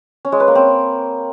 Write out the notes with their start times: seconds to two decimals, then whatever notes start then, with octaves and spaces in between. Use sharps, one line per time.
0.25 C#4
0.32 G#3
0.40 B4
0.48 A#3
0.55 C4